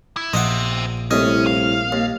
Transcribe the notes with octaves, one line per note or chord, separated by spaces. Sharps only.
E4
A#1 C5 D#5 E5 F#5
C2 A2 C#4 D#5
F5
D#2